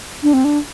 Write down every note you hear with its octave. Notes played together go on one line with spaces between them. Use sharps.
D4
C4
D4